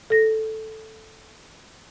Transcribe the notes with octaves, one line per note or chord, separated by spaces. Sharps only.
A4 A#6